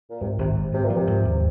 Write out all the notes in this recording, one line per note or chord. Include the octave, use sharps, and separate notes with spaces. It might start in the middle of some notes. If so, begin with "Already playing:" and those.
A#2
G#2 C3
G#1 C3
G#2
G#2 C3
A#2
F3
C3
G#2
D#2